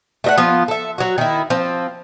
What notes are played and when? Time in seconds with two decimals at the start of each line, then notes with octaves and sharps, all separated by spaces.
0.24 A3 D#5 F#5
0.38 F3 B3 F4
0.68 A4 E5
0.98 F#3 F#4
1.18 D#3 E4
1.50 F3 C4